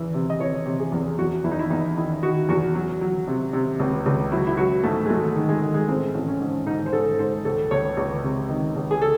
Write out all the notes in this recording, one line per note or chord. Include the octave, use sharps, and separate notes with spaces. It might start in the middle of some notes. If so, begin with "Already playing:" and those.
Already playing: E2 E3
C3
D#5
E3 C#5
C3
G#4
E2
E2 F#4
E2 E4
D#4
E4
E2 D#4
D#3 E4
D#3 F#4
E2 F#4
F#3
F#3
C3
C3
C#2
C#2
F#3 E4
E4
F#3 F#4
G#2 A3
G#3
F#3 A3
D#3
G#3
D#3
G#3
A1 C4
A1
C#4
G#2
G#2 D#4
C5
G#2 A4
G#2 C5
C#2 A4
C#2 C#5
C#2
C3
D#3
C#2
G#4
A4